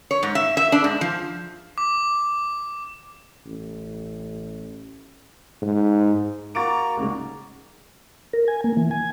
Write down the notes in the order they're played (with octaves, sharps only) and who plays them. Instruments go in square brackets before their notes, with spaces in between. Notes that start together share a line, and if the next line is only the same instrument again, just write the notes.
[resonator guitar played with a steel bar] C#5
G#2
E5
E5
D4
G#2
F3
[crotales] D6
[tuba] A1
G#2
[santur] A#3 F#4 [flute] A#5 [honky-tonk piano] A6 D7
[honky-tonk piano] C2 G#2 C#3
[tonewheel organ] A#4
G#5
A#3
E3
G#5